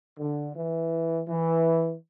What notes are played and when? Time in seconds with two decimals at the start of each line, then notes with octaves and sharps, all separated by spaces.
0.18 D3
0.56 E3
1.28 E3